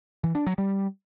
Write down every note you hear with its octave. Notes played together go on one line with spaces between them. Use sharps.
E3
D4
F#3
G3